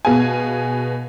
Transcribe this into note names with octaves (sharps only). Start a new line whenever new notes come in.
B2 B3 G#4 F5 G#5